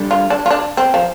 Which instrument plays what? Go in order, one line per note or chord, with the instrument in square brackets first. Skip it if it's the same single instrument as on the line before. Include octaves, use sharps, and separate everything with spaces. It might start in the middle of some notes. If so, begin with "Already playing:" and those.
Already playing: [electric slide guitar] G3 D4 A4
[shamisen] F4
D4
F4
D4
C4
F3